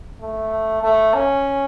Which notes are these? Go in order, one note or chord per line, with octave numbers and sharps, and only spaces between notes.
A3
A3
C#4